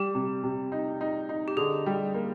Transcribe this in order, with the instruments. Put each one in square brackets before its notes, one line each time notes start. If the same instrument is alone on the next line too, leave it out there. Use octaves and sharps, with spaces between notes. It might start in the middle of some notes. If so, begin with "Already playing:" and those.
Already playing: [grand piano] G3 [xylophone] G4
[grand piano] C3
C3
D#4
D#4
D#4
[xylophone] G4
[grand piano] D3 [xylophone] G#4
[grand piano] G3
A#3